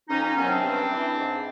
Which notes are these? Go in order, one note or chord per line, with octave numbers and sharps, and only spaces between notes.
F2 C#4 D#4
C#4 D#4
C3 D#3 F#3 B3 C#4
C4 D4
G2
E3
G#2